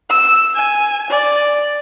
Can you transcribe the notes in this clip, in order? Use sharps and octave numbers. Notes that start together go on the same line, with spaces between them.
E6
G#5
D5